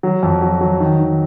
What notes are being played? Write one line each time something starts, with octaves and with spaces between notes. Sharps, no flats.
F#3
F2
F#3
F#3
D#3
D#3